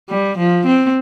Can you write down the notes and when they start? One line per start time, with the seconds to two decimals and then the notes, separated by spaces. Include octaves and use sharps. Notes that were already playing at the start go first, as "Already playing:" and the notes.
0.09 G3
0.37 F3
0.66 C4